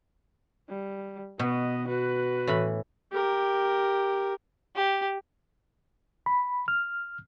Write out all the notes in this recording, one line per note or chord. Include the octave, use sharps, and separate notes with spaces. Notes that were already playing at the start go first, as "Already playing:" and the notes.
G3
B2 B3 D#5
F#4 B4
A2 E3 B5
G4 A#4
G4
B5
F6